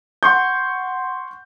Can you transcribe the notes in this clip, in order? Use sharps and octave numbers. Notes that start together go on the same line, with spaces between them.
F#5 C6 C#6 G6